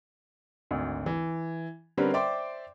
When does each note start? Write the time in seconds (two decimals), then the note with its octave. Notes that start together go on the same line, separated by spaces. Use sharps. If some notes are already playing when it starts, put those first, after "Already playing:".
0.71 G#1 D2
1.06 E3
1.97 D3 G3 C4 C#4 A#4 B4
2.14 C5 D5 E5 G5 C6 D6